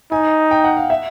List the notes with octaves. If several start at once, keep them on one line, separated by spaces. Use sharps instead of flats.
D#4 G#5
G5
F#5
F5
E5